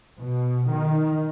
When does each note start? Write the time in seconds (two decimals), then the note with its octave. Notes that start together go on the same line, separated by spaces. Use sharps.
0.20 B2
0.71 D#3